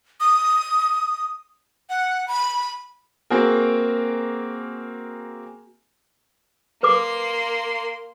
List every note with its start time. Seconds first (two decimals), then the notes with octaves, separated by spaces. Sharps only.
0.20 D#6
1.90 F#5
2.28 B5
3.30 A#3 C4 F#4 G#4 A#4
6.83 A#3 B4 C6 D6